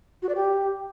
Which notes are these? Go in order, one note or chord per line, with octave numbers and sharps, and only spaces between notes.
F#4
D5
G4